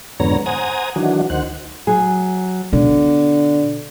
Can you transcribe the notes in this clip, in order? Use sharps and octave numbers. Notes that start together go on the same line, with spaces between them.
F2 G#2 D3 B3 C#5 A#5
C5 F#5 G#5 A#5 D#6
D#3 E3 F#3 D4 F#4
D2 D#3 C5 F#5 F#6
F#3 G#4
B2 D3